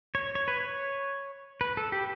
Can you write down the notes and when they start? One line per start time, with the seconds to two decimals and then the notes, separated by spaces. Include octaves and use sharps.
0.15 C#5
0.35 C#5
0.48 B4
0.60 C#5
1.61 B4
1.77 A4
1.92 G4